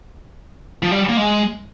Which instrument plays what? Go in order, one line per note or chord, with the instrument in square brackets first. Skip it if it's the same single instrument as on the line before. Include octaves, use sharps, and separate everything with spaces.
[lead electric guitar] F3
G3
A#3
G#3